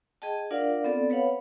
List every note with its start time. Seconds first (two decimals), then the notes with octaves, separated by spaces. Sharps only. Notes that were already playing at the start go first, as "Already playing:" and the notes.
0.22 G#4 D#5 G5 A5
0.51 D4 F4 A#4 D5 F5 F#5
0.84 B3 C4 A4 D5
1.10 B4 C#5 F5 F#5 B5